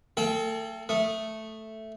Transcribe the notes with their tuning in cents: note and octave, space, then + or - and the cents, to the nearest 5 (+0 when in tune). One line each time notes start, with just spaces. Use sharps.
A3 +35 A4 -40 G5 +0
A3 +0 D#6 -5